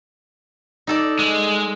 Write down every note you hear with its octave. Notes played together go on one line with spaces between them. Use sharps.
D#4 A4 D5
G#3